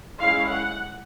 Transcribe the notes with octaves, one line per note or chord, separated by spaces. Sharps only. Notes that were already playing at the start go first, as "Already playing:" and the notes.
G#3 C#4 E4 F5
F#5